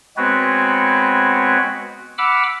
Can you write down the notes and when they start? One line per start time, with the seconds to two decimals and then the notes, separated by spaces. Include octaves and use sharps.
0.17 G#3 B3 C4 F#4 B4 C#5
2.18 F#5 B5 D6 E6 F6